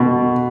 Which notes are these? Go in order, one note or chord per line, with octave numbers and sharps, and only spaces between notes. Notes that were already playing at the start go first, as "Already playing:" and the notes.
Already playing: B2